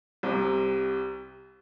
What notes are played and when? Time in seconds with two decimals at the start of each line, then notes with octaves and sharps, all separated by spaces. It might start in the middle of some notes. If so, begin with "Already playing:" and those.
0.23 C2 C3